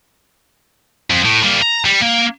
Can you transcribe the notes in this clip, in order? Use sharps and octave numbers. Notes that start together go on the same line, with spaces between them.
F2
A2
G3 A#3
A#5
G3
A#3